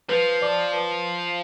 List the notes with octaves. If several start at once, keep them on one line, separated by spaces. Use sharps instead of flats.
F3 B4
D5 A5 D6
B4